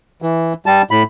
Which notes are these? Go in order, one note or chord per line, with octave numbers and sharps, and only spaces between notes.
E3
G3 A5
A2 B5